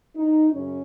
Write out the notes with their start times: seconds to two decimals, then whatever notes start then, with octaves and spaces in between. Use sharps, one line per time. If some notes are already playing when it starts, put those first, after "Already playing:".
0.16 D#4
0.53 F#2 C#3 C#4